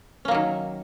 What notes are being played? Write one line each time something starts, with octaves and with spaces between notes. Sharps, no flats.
D#3 F#3 A#3 C#4